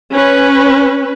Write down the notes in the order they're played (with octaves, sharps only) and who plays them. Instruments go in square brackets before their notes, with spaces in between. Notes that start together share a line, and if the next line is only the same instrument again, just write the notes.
[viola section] C#4 B4